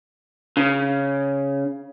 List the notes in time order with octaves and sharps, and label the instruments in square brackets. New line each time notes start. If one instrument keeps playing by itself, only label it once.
[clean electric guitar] C#3